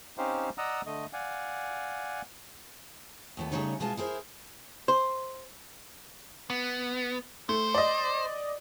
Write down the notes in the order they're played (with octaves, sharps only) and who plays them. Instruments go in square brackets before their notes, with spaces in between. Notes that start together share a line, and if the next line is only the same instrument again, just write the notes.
[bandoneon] C4 C#4 D#4 G4 C5 F5
D5 D#5 F#5 A#5 D#6 E6
D3 A3 D#5
D5 F5 F#5 G#5
[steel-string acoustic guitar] D#2 A3 B3
C#3 E3 G3 A3 D#4 C#5
B2 G#3 B3 E4 F4 A5
E4 G#4 A#4 C5
[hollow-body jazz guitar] C5
[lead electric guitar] B3
[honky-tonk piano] A3 [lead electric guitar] C5
[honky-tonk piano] D5 D#5